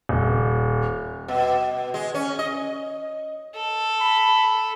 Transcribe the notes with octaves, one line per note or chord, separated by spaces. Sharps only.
D#1
B2
G#3
C#4
D#5
A4
B5